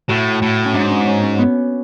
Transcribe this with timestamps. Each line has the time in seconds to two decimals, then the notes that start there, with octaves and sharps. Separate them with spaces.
0.09 A2 F#4
0.42 A2
0.65 C#4
0.74 G#2 D4
0.91 C#4
1.07 C#4
1.23 C#4
1.39 B3